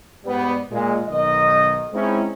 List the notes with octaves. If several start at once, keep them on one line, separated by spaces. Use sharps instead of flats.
G#2 G3 B3
A#2 G#3
B1 D#3 D#5
G#3 C4 C#4 D#4 E4